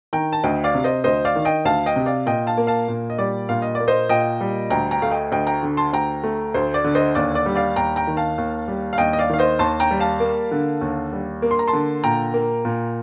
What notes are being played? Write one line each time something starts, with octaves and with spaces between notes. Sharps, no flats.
D#3 G5 A#5
A5
D2 D#5 G5
D5 F5
C3
C5 D#5
D2 C5 D#5
D5 F5
D#3
D#5 G5
D2 F5 A5
D#5 G5
C3
D5 F5
A#2 D#5 G5
F5 A5
A#3
F5 A5
A#2
D#5
G3 D5
A#2 F5
D#5
D5
A#3
C5 D#5
A#2 D#5 G5
G3
D2 G5 A#5
G5 A#5
A3 F5
D#5 G5
D2 D#5 G5
G5 A#5
D3
A5 C6
D2 G5 A#5
A3
D2 C5
D5
D3
C5 D#5
D#2 D5
D5
G3
D5 F5
D#2 G5 A#5
G5 A#5
D#3
F5 A5
D#2
G3
F5
D#2 D#5 G5
D#5
D5 F5
D#3 F5
C5 D#5
D#2 A5 C6
G5 A#5
G3
F5 A5
A#3
D3
D#2
G3
A#3
C6
A#5
A5 C6
D3
A#2 G5 A#5
A#3
A#2